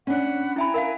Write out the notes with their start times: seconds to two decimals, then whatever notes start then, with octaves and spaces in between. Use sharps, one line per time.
0.07 C#4 D4 F#5 B5
0.56 E4 E5 G5 G#5 A#5 B5
0.74 A#4 E5 F5